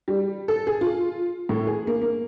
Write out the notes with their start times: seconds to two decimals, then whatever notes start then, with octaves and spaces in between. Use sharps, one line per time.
0.08 G3
0.48 A4
0.67 G#4
0.81 F4
1.49 A2
1.67 G#4
1.87 A#3
2.02 A#3